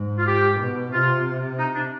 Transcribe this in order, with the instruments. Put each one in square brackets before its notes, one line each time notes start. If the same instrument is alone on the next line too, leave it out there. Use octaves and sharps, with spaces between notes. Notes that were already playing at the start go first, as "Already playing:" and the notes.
Already playing: [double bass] G#2
[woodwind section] F4
G4
[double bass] B2
[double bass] C3 [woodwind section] F4
[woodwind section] D#4
D4